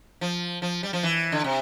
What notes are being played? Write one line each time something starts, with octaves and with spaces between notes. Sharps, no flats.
F3
F3
G3
F3
E3
D3
C3